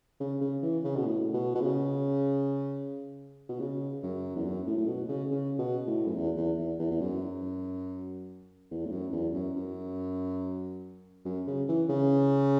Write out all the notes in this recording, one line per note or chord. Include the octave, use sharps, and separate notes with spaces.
C#3
C#3
E3
C#3
B2
A2
B2
B2
C#3
B2
C#3
F#2
E2
F#2
A2
A2
B2
C#3
C#3
B2
A2
F#2
E2
E2
E2
E2
E2
F#2
E2
A2
F#2
E2
F#2
F#2
F#2
C#3
E3
C#3